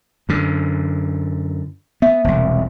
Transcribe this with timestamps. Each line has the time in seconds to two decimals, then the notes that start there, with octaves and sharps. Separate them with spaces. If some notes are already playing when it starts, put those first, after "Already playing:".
0.29 F#2 D3
2.02 B3 E5
2.24 E1 C2